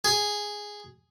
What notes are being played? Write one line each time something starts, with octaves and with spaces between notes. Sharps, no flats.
G#4